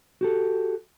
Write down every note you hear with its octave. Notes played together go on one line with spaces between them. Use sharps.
F#4 G4 A4